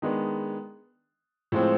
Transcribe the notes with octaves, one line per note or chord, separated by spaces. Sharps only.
D#3 G#3 B3 D4
A2 F3 G#3 C4